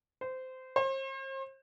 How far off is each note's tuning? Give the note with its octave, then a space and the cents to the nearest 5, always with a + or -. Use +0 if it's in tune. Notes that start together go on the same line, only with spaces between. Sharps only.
C5 -20
C5 +40